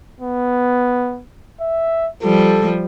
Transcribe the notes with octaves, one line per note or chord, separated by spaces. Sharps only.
B3
E5
F3 G3 A4